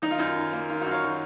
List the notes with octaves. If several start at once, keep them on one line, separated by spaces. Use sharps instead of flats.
D#3 D#4
F4
F#2 D#4
D#3
A#3
D#3 F4
D#4 F#4
F#2
C#5 F5
D#3